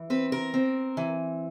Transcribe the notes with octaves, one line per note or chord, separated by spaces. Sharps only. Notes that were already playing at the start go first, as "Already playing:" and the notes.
Already playing: E3
C4 B4
A#4
C4
E3